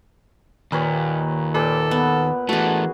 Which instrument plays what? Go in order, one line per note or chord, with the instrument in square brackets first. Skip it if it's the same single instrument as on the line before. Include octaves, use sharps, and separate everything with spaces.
[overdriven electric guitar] D#2 [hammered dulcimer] A#2 B4 C#5
[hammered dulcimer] A#2 B4 D6 [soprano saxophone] A4
[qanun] B3
[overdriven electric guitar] E3 A3 [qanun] F#4 G#4 [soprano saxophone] A5